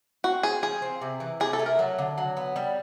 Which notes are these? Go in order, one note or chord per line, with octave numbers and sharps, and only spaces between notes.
C4 F#4
C4 G#4
F3 G#4
C4
C3
E3
C3 G#4
A4
A3
A#4
F#3
D3
F#3
B3
G3